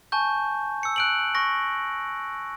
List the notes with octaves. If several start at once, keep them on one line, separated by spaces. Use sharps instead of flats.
G#5 A5 C#6 G6
E6 C#7
F#6 D7 F#7
C#6 A#6